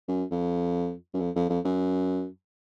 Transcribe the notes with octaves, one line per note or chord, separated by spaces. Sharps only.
F#2
F2
F#2
F2
F2
F2
F#2